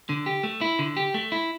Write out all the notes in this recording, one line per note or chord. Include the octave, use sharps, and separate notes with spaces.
D3
G4
A3
E4
D3
G4
A3
E4